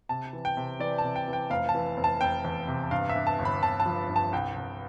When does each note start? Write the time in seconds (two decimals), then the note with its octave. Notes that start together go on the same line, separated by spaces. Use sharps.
0.09 C3 A5
0.33 E3
0.45 G5
0.57 C3
0.80 E3 D5
0.98 A5
1.04 C3
1.16 G5
1.28 E3
1.33 G5
1.50 F1 F5
1.69 A5
1.75 E3
1.97 F1
2.04 A5
2.21 F1 G5
2.45 E2
2.68 C3
2.91 G2 F5
3.09 E5
3.15 G2
3.27 A5
3.39 G1
3.45 B5
3.62 G1 A5
3.80 A5
3.86 F3
4.09 G2
4.16 A5
4.32 C2 G5
4.56 C2